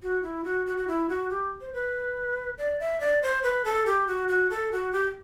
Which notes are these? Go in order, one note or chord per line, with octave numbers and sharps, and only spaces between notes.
F#4
E4
F#4
F#4
F#4
E4
F#4
G4
C5
B4
D5
E5
D5
C5
B4
A4
G4
F#4
F#4
A4
F#4
G4